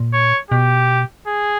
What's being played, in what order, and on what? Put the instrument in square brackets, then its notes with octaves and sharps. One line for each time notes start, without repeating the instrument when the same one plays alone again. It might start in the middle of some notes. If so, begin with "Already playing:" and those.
Already playing: [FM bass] A#2
[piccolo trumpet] C#5
[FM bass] B2 [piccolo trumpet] G4
[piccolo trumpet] G#4